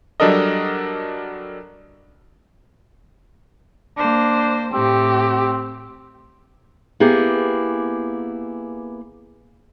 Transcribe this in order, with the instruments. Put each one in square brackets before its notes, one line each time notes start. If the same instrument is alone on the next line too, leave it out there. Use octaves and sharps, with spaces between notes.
[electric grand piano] F#3 G3 D4 A4 A#4 D#5
[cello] A#3 C5 [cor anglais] D4
[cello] A2 [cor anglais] C4 [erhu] G4
[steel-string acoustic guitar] A#3 B3 E4 G4 G#4